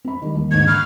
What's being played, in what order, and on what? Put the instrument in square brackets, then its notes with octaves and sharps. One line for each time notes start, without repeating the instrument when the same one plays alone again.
[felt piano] C4 B5
D#3 G3
D#2 D#3
[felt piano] D#2 G#2 D3 [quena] G#6
[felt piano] B5 C#6 F#6 [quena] F6